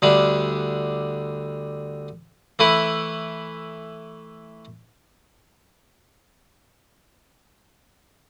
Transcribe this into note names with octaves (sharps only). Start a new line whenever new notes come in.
D2 D3 G3 D4
E3 A3 E4 B4